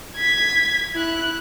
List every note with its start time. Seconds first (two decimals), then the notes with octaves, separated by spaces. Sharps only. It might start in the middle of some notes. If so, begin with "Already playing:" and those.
0.17 G#6 B6
0.95 E4 F#6